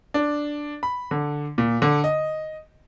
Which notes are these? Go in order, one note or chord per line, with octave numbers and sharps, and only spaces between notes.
D4
B5
D3
A#2
D3
D#5